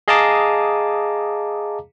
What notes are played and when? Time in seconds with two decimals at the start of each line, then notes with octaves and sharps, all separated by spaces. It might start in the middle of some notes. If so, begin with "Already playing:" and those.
0.08 G#4 D#5 F5 A5 A#5 D6